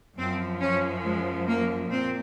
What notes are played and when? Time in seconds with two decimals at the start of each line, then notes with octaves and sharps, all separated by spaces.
0.18 F#2 F3 C4
0.61 C#4
1.05 G#3
1.48 A#3
1.91 A#2 C4